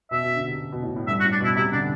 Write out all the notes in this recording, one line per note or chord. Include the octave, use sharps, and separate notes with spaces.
B2 E5
B2
D3
C3
C3
B2
A2
A2
G2 E5
F#4
A2
D4
B2 E4
C3 E4
D3 D4